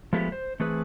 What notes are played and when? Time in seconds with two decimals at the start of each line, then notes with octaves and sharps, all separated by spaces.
0.13 F3 G#3 A3 B3 G4
0.32 C5
0.60 E3 A3 C4 G#4 B4